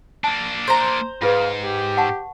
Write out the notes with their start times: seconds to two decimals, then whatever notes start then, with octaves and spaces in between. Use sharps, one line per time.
0.24 A#3 D4 A5
0.68 C5 A#5
1.22 G#2 F4 G#4 B4 F5
1.63 G4
1.97 F#5 A5 C#6